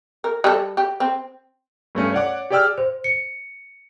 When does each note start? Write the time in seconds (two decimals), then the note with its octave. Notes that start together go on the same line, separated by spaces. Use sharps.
0.24 A#4
0.44 G3 A4
0.77 G4
1.00 C4
1.95 G2 A3 C#4 C#7
2.13 C#5 D5 F#5 D6
2.50 G4 G#4 D5 G5 E6 F6
2.78 C5
3.04 C#7